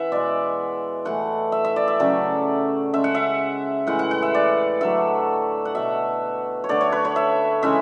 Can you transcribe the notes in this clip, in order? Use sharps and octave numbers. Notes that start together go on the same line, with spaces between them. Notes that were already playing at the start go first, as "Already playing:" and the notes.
Already playing: E3 E5 F#5
B2 G#3 D5
A2 E3 A3 F#5
E5
E5
D5
E5
C#3 F#3 A3 D5
C#3 G#3 E5
F#5
E5
A2 E3 G#3 F#5
F#5
F#5
E5
D5
D3 F#3 A3 E5
F#5
B2 A3 E5
C#5
D3 A3 D5
C#5
B4
C#5
E5
C#3 E3 G#3 E5